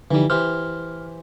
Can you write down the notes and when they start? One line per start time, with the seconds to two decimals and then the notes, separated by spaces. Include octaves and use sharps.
0.11 D3 E3 F3 G3 D#4
0.30 E3 G4 C5 F6